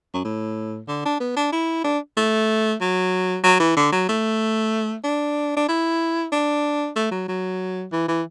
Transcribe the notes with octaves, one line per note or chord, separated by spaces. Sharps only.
F#2
A2
D3
D4
B3
D4
E4
D4
A3
F#3
F#3
E3
D3
F#3
A3
D4
D4
E4
D4
A3
F#3
F#3
E3
E3